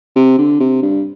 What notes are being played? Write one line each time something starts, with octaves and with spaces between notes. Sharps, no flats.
C3
D3
C3
G2